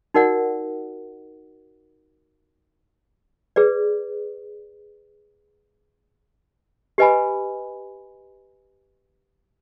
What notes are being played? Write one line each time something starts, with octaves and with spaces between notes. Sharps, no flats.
D#4 F#4 A#4 D5 F#5
G#4 B4 D5
G4 B4 D#5 G#5 B5